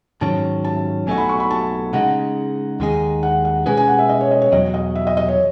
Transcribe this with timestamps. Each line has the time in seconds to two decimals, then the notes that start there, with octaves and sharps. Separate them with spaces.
0.21 G#2 D#3 F#3 C#4 A5
0.64 A5
1.07 B1 B2 A3 D#4 F#4 G#5
1.18 B5
1.29 C#6
1.40 B5
1.50 A5
1.93 C#3 G#3 D#4 F#5
2.80 D#2 D#3 G#3 D#4 G#4
3.23 F#5
3.45 F#5
3.66 B2 G#3 C#4 G#4 B4 G#5
3.77 G#5
3.88 F#5
3.99 E5
4.09 D#5
4.21 C#5
4.31 D#5
4.42 C#5
4.52 E2 B2 F#3 D#5
4.74 D#5
4.95 E5
5.07 D#5
5.17 D#5
5.28 C#5